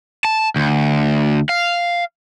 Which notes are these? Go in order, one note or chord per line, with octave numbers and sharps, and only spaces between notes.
A5
D2
F5